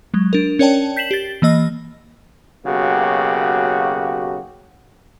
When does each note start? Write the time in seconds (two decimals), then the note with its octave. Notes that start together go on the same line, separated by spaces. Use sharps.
0.14 F#3 G#3
0.33 D4 A#4
0.59 C#4 A#4 C#5 D5 G5 A5
0.96 G6 B6 C7 E7 F#7
1.11 G4 A6
1.42 E3 A#3 D#5 E6
2.66 B1 C#3 A#3 F#4 G4